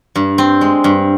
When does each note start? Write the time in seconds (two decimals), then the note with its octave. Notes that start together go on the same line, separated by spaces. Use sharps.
0.16 G2
0.38 C4
0.61 G#3
0.84 G2